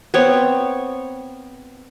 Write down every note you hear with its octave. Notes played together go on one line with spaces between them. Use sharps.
B3 C4 C#5